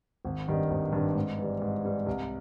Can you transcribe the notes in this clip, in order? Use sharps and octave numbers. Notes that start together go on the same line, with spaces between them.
G#1
G2 D#3 G3
G#1
G2 D#3 G3
G#2
E3 G3
G#2
E3 G3
C2